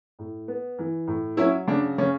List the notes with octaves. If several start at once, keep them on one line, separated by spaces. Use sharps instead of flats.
A2
B3
E3
A2
F#3 C#4 E4
C#3 D4
C#3 C#4